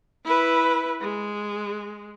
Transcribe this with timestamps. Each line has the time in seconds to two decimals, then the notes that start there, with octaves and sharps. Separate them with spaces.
0.25 E4 B4
1.01 G#3